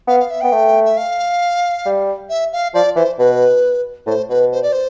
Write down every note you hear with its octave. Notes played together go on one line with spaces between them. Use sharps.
B3 F5
F5
E5
B3 G5
A3
E5
F5
G3
E5
F5
F3 D5
E3 C5
B2 B4
A2 C5
B2 B4
C5
D5
C5